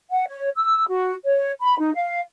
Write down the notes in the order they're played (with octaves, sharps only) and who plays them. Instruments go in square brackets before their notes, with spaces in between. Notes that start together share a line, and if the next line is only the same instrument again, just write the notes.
[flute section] F#5
C#5
E6
F#4
C#5
B5
D#4
F5